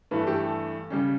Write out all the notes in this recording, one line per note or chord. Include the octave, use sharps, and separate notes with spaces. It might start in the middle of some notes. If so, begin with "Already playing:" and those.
G2 E3 A3 B4
A4
G4
A4
C#3 G3 C#4